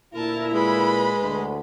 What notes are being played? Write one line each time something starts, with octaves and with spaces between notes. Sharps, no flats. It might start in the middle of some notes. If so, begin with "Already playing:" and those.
D2 A#2 E4 A#4 A5
G#3 B4 B5
D2